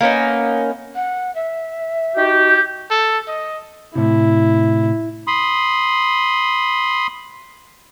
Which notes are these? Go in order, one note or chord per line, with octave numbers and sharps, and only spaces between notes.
A#3 B3 C#4 D#4
F#5
E5
D#4 F#4 G4
G6
A4
D#5
A2 C3 E4
B5 C6 D#6